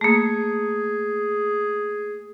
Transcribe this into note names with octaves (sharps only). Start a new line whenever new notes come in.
A3 A#3 G#4